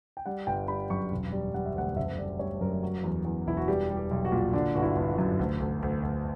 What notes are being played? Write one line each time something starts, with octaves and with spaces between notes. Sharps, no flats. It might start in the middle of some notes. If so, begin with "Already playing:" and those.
G5
G3 F#5
G1 G5
G3 B5
F#2 C#6
E1
G3
G3 F#5
E5
D2 F#5
F#1 E5
G3 D5
G3 C#5
F#2 A#4
F#3
E2
E2
E1 E4
F#4
G3 G4
G3
G4
B1
F#4
A#2
D3 D4
G1 F#4
E4
G1
F#4
F#2
D2
D2
D2
D2